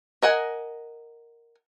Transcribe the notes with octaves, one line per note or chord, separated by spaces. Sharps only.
A#4 D#5 F#5 G#5